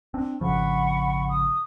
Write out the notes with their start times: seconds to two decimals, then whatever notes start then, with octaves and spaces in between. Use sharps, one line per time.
0.14 C4 D4
0.41 G#1 C#3 F3 F#5 B5 C#6
1.29 D#6